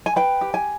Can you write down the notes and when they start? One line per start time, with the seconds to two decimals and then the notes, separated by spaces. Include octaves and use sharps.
0.06 G#5
0.16 B4 G5
0.41 G4
0.54 G#5